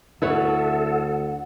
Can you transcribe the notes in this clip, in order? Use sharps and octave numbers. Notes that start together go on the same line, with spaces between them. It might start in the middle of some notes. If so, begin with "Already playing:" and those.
D2 E4 A4 B4 C#5 F#5